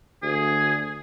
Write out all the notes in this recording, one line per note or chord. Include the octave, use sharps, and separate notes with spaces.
D2 G#4